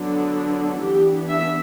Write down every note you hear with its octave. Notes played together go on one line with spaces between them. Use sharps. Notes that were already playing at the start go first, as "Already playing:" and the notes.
Already playing: D3 F#3 B3 D4
E3 B3 D4 G4
E5